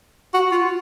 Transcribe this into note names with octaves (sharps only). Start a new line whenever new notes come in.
F#4
F4